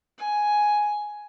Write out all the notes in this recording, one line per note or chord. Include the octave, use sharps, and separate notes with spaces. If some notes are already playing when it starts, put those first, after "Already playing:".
G#5